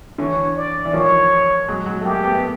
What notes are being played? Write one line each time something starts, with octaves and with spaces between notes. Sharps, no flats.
D3 E3 C#5
D5
E3
D#3 F3 C#5
F#3 G#3
F#3 G#3
A3
G#3 A#3 G4
A3 B3
B3